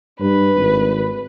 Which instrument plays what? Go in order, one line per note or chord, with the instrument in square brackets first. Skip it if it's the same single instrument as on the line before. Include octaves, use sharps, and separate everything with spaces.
[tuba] G2 [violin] B4
[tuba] G#1